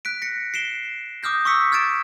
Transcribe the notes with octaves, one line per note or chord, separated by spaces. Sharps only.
F#6 B6 D7
A#6 C#7
C7 D7 E7 G7
D6 D#6 F6 G6 A#6
C#6 D6 E6 B6 C#7
F6 G#6 A6 D7 E7